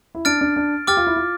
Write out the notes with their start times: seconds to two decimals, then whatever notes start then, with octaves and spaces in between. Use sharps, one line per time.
0.15 E4
0.25 D4 F6 A6 D7
0.41 D4
0.56 D4
0.87 G4 D6 F6 A6
0.97 F4
1.07 E4
1.16 F4